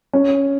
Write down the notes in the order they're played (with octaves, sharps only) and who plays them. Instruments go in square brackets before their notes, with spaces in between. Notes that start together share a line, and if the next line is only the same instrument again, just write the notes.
[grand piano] C#4